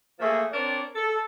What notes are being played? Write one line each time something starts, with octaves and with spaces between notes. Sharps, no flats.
A#2 F3 A3 A#3 G#4
C4 D4 A#4 C#5 D5
A4